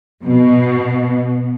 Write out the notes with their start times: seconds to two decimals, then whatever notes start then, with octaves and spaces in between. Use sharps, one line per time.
0.24 B2